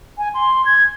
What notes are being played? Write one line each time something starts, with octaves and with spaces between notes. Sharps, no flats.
G#5
C6
G#6